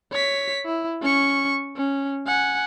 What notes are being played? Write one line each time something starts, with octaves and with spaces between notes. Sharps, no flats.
C#5 B6
E4
C#4 C#6
C#4
F#5 G#5